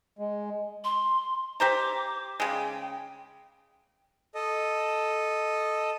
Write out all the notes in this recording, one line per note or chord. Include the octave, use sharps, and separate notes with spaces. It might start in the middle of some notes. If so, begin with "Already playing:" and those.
G#3
C6
G4 C5 A#5 D6
C#3 G#3 G5
A4 D#5